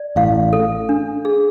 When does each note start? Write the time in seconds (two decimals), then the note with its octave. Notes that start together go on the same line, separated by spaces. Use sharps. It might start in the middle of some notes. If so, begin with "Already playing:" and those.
Already playing: D5
0.16 A1 A2 F5
0.53 A4
0.89 D4
1.25 G#4